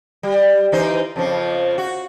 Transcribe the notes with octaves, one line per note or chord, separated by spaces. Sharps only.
G3
E3 D#4 C5
F2 C#3 F3
F#4